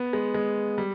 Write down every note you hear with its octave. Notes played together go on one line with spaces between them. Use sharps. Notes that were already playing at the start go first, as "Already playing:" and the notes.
Already playing: B3
G#3
G#3
G3